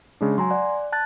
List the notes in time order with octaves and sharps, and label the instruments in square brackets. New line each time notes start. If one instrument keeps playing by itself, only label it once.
[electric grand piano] C#3 G#3 D4
[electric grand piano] F#3 [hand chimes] G#5 A#5 C6
[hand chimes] D5 [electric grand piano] F#5
[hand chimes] A5 F#6 A6